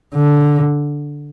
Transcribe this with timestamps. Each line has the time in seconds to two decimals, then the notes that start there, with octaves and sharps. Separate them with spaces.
0.15 D3